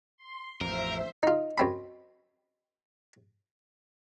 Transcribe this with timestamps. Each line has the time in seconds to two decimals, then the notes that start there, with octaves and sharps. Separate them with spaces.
0.17 C6
0.61 A1 F2 A#4 C5 E5
1.23 D#4 F4 D#5
1.58 F#2 C4 B5